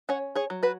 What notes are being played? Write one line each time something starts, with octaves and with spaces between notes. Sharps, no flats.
C#4 C#5 F#5
G#4 C#5
F#3
F#4 B4